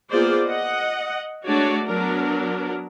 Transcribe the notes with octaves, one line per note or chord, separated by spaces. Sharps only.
A#3 B3 F4 G#4 C5 D5
D#5 F#5
G#3 A3 D4 F#4 C#5 D5
F#3 B3 D4 A#4